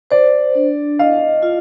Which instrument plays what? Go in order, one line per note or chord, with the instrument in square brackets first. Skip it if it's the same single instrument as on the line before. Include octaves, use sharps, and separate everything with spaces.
[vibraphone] C5 [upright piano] D5
[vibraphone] D4
[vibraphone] D#5 [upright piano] F5
[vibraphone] F4